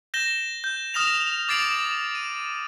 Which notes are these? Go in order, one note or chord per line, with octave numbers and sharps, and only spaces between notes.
G6 A#6 E7 G7
G6
D#6 F6 A#6 E7 F7
D6 A6 C7 D7 F#7
D#7